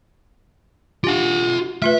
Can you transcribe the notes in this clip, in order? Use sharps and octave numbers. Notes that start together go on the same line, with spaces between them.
D4 F4 G4 F#5
A3 F4 B4 E5